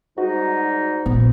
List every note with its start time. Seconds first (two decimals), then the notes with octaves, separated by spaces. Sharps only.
0.18 G#2 G3 D#4 F#4
1.06 A#1 B3